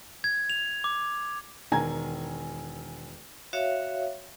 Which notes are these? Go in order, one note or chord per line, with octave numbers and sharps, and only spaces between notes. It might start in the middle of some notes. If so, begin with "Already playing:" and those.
G#6
F7
D6
E1 D#3 G#5 A#5 G#6
F#4 C#5 E5 F5